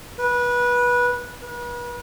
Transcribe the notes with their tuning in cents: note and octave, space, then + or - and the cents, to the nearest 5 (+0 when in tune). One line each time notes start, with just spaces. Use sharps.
B4 -20
B4 -40